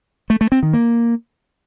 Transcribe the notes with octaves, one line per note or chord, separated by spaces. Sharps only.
A3
A3
C4
D#3
A#3